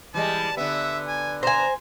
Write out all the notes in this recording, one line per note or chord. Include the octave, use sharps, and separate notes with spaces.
E3 G3 G#3 A5
D3 B3 E5
G#5
C5 G#5 A#5